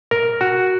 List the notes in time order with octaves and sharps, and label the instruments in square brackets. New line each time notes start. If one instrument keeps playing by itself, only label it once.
[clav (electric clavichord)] A#4
F#4